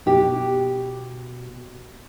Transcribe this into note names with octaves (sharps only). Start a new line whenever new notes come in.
B2 G4